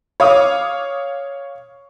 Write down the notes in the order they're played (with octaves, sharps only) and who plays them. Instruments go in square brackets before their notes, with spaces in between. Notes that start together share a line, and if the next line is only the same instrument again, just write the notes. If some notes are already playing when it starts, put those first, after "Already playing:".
[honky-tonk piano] C#5 F5 D6 D#6